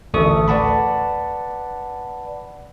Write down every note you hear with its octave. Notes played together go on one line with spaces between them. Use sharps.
A1 D2 A3 A4 C#6 D#6
B4 D5 F#5 A5 B5